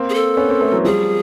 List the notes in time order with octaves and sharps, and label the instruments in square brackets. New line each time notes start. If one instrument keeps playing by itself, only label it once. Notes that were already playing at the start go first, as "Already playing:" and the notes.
Already playing: [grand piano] A#3 C4
[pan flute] G#4
A4
[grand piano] B3 C#4
A#3 C4
A3 B3
E3 F#3
[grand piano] F3 G3 [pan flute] G#4